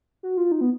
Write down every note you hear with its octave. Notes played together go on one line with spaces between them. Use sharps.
F#4
F4
D#4
B3